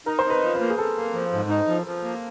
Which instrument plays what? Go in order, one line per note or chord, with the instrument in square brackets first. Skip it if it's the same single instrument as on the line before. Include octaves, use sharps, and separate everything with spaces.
[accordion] D#4 [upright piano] A#4
[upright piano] C5
[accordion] D#4
[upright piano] B4
[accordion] F3
[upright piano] B4
[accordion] A#3
[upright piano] G#4
[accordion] A#3 [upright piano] A4
[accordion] A#3
F3
G#2
D#4
F3
F3
A#3